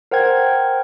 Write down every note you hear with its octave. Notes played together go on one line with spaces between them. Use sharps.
A#4 C5 F#5 G5 G#6